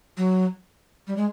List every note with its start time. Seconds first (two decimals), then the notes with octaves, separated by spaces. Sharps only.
0.17 F#3
1.07 G3
1.16 G#3